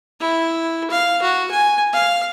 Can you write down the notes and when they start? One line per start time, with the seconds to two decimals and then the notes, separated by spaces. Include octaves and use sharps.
0.20 E4
0.91 F5
1.22 F#4
1.51 G#5
1.93 F5